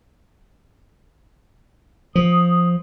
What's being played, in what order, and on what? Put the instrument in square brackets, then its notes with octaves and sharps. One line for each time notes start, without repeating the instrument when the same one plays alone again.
[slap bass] F3 [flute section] D#6